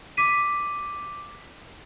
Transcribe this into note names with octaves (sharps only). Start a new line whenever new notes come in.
D6 B6 D#7